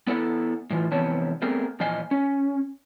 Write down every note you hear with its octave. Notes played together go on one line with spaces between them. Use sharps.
B3 E4 A4 F#5
A2 E3 F4
F2 C3 E3 B3 C#5 A5
A3 B3 C4 G#4 A#4
E2 A#2 F3 D#5 F5 G#5
C#4